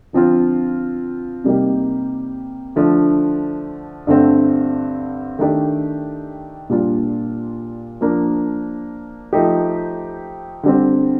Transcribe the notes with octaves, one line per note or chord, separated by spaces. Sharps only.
D3 F3 C4 F4
C3 G3 A#3 D#4 G4
D3 F3 A3 D4
G2 D3 A3 C4
D#3 A3 D4 G4
A#2 G3 D4 F4
F3 A#3 D4
F3 A3 D#4 G4
D3 G3 C4